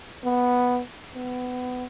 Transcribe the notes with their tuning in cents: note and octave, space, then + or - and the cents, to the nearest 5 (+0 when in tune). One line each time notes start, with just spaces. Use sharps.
B3 -5
B3 +20